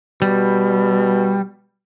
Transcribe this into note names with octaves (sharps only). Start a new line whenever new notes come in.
B2 G3